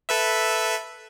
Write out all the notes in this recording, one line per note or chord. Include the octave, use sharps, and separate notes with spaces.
A4 B4 E5